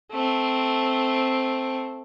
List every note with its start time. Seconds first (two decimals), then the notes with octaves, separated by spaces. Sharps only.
0.11 A3 C4